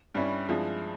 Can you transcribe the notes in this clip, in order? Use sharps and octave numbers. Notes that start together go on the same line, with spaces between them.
G2 G3 C#4 E4
G2 F3 G#3 E4